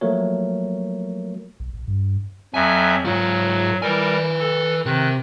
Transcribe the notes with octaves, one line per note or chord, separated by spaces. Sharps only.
F3 F#3 A3 A#3 A#4 C#5
B1
A#1
G2
F2 F#3 E5 G#5
G#2 F#3 F4
G3 A#4 B4 G#5
A4
C3 D#3 F#6